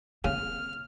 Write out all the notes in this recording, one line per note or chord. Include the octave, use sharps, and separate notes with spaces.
C#3 A#3 C4 F6